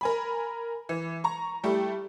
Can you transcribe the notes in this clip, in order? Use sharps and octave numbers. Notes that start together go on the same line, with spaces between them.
A#4 G#5 B5
E3
A#5 C#6
G3 A3 E4 G4